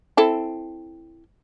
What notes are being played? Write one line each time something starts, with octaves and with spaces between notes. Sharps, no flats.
C4 E4 A4